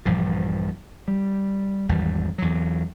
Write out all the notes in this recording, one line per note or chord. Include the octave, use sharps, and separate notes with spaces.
A#1 G2 E3 F3
G3
G#1 E2 G3
E2 F#3